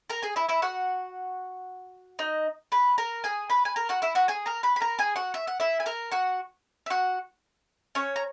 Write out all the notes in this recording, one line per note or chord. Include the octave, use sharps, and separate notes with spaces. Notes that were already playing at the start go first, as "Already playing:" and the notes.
A#4 A#5
G#4 G#5
E4 E5
E4 E5
F#4 F#5
D#4 D#5
B4 B5
A#4 A#5
G#4 G#5
B4 B5
G#5
A#4 A#5
F#4 F#5
E4 E5
F#4 F#5
G#4 G#5
A#4 A#5
B4 B5
B5
A#4 A#5
G#4 G#5
F#4 F#5
E5
F#5
E4 E5
G#5
A#4 A#5
F#4 F#5
E5
F#4 F#5
C#4 C#5
A#5